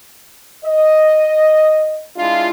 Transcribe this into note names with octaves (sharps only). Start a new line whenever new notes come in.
D#5
G#3 D4 E4 F4